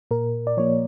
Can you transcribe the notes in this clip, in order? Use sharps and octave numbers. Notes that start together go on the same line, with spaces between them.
A#2 A#4
D5
F3 A#3 C#5